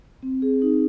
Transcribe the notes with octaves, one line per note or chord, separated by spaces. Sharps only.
C4
G#4
D#4